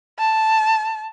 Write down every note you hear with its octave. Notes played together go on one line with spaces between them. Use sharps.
A5